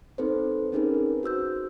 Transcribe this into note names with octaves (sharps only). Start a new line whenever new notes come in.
C4 D#4 A4 B4 C5
C4 C#4 D#4 G#4 A#4 B4
F#4 C5 E6 G6